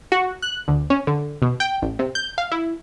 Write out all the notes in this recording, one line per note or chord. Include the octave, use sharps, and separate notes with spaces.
F#4
F#6
D2
C#4
D3
B2
G5
A1
C3
G6
F5
E4